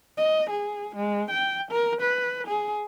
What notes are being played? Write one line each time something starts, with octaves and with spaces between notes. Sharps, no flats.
D#5
G#4
G#3
G5
A#4
B4
G#4